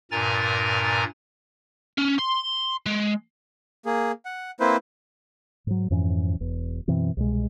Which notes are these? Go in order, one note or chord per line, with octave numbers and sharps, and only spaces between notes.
G2 A#2 A#4 G#5 A#5 A6
C#4
C6
G#3
A#3 G#4
F#5
A#3 C4 E4 B4 C5
G#2 F#3
F2 G#2 E3 C#4
E1 E2
F#2 B2 E3 C4
C2 B2 G#3